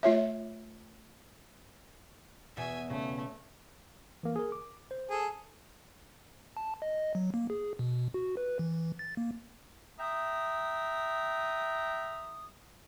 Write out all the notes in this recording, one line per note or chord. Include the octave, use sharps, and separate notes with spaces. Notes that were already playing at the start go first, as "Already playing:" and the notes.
A3 F4 C#5 E5
E2 B2 E5 G#5
C#3 A3
E3 A#3
G#4 A#4
D6
C5
G#4 A4
A5
D#5
F#3
A#3
G#4
B2
F#4
B4
E3
A6
A#3
E5 G5 A#5 D#6